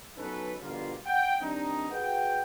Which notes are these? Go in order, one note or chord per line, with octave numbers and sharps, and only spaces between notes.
F#3 B3 C#4 D#4 A4 B4
B2 D3 F3 G3 A#3 F4
F#5 G5
D#3 G3 C4 D4 D#4
F#4 G#4 B4 F#5 G5